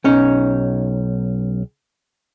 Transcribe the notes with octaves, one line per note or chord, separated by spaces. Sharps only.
B1 C#4 D#4